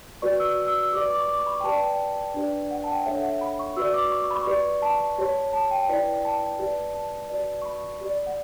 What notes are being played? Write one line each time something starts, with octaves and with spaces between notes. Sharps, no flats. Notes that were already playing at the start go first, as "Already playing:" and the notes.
F#4 B4 D5 C#6
E6
E6
E6
G4 B4 D5 D6
D6
C#6
D6
C#6
B5
G5
G4 B4 D5 A5
A5
G5
D4 G4 B4 D5
F#5
A5
G5
F#5
D4 A4 C#5 E5
F#5
B5
C#6
F#4 B4 D5 E6
D6
C#6
C#6
B5
C#6
G4 B4 D5
A5
G4 C#5
A5
G5
E4 B4 D5
A5
G4 B4 D5
A5
F#4 B4 D5
C#6
B5
G4 D5
F#5